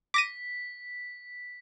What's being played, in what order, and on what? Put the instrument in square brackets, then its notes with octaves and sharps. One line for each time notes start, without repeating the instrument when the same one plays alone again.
[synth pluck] D6 A#6 D#7 [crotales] B6